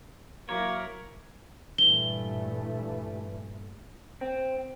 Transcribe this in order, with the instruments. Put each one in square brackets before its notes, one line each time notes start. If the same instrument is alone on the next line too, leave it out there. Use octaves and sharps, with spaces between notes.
[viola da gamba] F#3 E4 A#4 [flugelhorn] A#3 [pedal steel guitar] C#5
[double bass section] G2 A#2 A3 [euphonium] E3 [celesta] G7
[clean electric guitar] C4